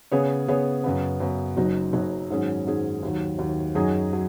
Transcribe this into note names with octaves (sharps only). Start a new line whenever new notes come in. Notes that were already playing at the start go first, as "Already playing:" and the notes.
C#3 B3 G#4 C#5
C#3 B3 G#4 C#5
F#2 C#3 B3
F#2 C#3 B3
F#1 F#2 F#3 D#4 F#4
F#1 F#2 F#3 D#4 F#4
G#2 D#3 F#3 C#4 G#4
G#2 D#3 F#3 C#4 G#4
D#2 D#3 F#3
D#2 D#3 F#3
F#2 F#3 D#4 G#4
F#3